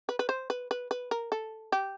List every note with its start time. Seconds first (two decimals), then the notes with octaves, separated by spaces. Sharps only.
0.09 B4
0.19 B4
0.29 C5
0.50 B4
0.71 B4
0.91 B4
1.11 A#4
1.32 A4
1.72 G4